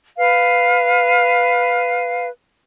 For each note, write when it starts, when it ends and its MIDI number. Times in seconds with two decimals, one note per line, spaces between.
0.17 2.27 71
0.17 2.27 77